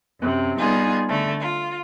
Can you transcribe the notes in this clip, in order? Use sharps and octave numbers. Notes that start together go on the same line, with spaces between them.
F#2 C3
G3 B3 D#4 F4 G#4
D3 A3
F4